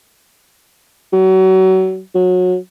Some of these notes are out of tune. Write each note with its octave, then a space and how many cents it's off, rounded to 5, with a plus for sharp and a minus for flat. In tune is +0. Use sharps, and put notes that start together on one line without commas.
F#3 +30
F#3 -25